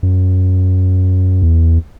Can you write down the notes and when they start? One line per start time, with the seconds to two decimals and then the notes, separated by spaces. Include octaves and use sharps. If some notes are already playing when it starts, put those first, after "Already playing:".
0.03 F#2
1.42 E2